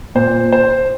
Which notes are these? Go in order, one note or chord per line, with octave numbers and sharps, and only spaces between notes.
A#2 C5
C5